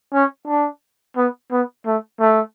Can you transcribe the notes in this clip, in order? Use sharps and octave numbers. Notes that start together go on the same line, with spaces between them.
C#4
D4
B3
B3
A3
A3